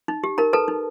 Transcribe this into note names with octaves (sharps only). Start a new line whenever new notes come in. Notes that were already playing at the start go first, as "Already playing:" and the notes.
D#4
G4
D#4 A#4 A#5
A4 B4 A5
D#4